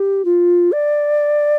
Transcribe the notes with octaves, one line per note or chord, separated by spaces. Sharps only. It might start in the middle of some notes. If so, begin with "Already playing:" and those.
Already playing: G4
F4
D5